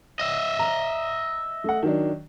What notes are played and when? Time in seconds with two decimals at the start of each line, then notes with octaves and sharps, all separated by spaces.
0.20 D#5 E5
0.59 A#5
1.64 A3 F#5
1.83 D#3 F#3 D4